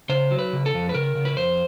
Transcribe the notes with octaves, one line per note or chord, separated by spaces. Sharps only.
C#3 C5
F#3
B4
C#3
A4
F2
B4
C#3 A#4
C#3
B4
F2 C5